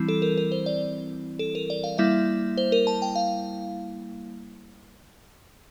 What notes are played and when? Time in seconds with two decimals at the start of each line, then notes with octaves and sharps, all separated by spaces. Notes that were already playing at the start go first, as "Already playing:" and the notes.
Already playing: E3 G3 C4 E4
0.08 A4
0.22 A#4
0.37 A#4
0.52 C5
0.66 D5
1.39 A4
1.55 A#4
1.70 D5
1.84 F5
1.98 G3 A#3 E4 E5
2.57 C5
2.72 A#4
2.87 A5
3.02 G5
3.15 F5